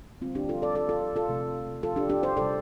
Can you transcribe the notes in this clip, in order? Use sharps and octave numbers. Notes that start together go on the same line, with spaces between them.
D3 G3 C4 F4
D4 G4
F4 A4
A4 D5
A4 D5
F4 A4
F4 A4
C3 A3
F4 A4
D4 G4
D4 G4
G4 C5
C3 G3 A4 D5